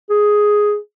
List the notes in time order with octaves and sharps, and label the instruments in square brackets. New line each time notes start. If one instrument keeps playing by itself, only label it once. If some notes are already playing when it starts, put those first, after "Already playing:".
[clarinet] G#4